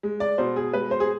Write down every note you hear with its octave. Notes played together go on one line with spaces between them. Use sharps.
G#3
D5
B2 C5
G#4
G#3 B4
C5
G#4